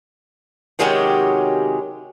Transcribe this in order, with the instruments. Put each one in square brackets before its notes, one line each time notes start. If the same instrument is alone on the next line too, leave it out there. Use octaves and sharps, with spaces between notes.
[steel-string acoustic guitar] C3 D#3 F#3 G#3 C#4 G4